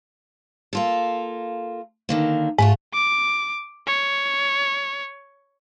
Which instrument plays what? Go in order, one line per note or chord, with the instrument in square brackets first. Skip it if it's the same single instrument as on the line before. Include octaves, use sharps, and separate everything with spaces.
[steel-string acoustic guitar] A#3 F4 A4
D3 D#3 A#3
[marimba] G#2 [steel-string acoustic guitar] A3 F4 F#4
[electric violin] D6
C#5